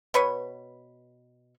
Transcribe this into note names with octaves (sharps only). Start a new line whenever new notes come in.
B2 B4 C#5